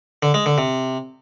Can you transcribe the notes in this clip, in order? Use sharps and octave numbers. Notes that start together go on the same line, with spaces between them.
D3
G#3
D3
C3